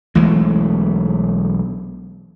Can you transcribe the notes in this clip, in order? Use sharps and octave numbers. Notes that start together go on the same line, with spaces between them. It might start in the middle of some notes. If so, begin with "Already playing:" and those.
B1 E3 G#3 A3